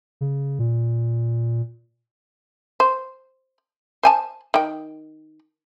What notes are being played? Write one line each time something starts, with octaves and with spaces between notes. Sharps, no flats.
C#3
A#2
C5
C5 G#5 A5
D#3 G5